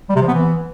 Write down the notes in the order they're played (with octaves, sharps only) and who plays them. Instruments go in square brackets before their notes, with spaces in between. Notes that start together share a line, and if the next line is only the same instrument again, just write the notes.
[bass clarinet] G3
C3
F3
B3
E3